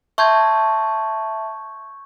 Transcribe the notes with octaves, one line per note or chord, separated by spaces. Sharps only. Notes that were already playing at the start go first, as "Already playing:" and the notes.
E5 A5 C6 C#6 G6 G#6